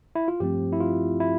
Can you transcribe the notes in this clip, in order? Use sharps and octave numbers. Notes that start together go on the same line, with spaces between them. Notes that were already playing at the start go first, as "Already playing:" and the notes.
E4
F4
G2 F3 A3 C4 G4
E4
F4
E4